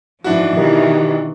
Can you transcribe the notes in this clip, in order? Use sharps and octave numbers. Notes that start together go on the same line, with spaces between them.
G#2 E3 F3 D4 E4 F#4
B2 D#3 E3 G4 A#4 D#5